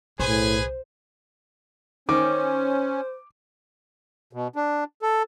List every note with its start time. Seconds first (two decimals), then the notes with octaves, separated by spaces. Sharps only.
0.19 B1 A2 G#4 B4 C5 G#5
2.09 D#3 C#4 C5 D6
4.33 B2
4.56 D4
5.02 A4